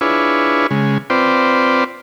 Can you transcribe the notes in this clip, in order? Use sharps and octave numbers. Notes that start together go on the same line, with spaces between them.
D4 E4 F4 G#4 B4 C#5
C#3 G#3
C4 F4 B4 C5 D5 G5